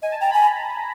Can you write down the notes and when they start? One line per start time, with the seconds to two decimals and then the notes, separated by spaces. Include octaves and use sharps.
0.02 D#5 G#5
0.12 A5
0.21 G5 A#5
0.31 G#5 B5